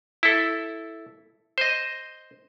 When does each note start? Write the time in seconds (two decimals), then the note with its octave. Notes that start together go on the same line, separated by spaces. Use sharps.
0.23 E4 A4
1.58 C5 D#5